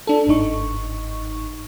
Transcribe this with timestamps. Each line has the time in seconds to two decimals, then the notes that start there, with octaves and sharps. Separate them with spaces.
0.07 D4 A4
0.27 G1 G#2 D#4 C#6